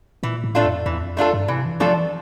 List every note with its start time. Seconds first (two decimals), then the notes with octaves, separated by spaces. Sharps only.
0.23 A#2 E3
0.44 A2
0.55 A3 D4 F4 A4
0.65 F2
0.86 E2 E3
1.02 F2
1.17 A3 D4 F4 A4
1.33 G2
1.48 C3 E3
1.65 E3
1.80 F3 A3 D4 F4 A4
1.96 E3